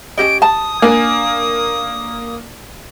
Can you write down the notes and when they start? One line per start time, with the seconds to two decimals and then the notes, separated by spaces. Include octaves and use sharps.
0.18 C#4 G4 D#5 D7
0.42 A5 D#6
0.82 A#3 D4 G#5